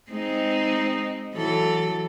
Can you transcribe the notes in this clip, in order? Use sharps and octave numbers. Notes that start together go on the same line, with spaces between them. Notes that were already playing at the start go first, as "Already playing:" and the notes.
G#3 C4 D#4
E3 F#3 A4